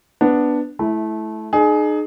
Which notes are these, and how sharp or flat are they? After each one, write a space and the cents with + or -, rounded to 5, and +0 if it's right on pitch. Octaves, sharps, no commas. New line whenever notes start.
B3 +0 D4 +0
A3 -20 E4 +0
D#4 -35 G#4 +25